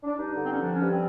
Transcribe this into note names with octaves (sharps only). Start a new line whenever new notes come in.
D4
G2 D#4
D3
C4
C#4
F3 D4
C#4
G2
C4